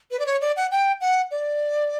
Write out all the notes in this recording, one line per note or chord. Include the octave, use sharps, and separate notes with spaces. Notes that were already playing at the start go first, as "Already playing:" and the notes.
B4
D5
C#5
D5
F#5
G5
F#5
D5